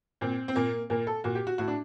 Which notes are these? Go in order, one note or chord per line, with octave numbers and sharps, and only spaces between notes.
A#2 C4
C4
A#2 A#3
A#2 A#3
A4
A#2 F#4
G4
F#4
A2 F#4
D4